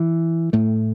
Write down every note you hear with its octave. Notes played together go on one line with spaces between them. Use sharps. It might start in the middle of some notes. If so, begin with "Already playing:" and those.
Already playing: E3
A2 A3